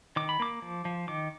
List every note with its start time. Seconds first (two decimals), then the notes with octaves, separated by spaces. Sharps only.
0.16 D#3 D6
0.29 B5
0.40 A#3 D6
0.62 F3
0.85 F3
1.08 D#3 D6